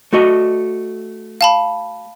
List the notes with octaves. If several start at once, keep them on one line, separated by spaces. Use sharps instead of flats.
A3 F#4 D#5
F5 A5 B5